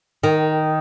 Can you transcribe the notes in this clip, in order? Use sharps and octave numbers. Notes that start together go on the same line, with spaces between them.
D#3